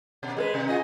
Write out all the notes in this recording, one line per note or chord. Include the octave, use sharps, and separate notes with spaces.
B2
G#3 A4 B4
C3
F4 G#4 D#5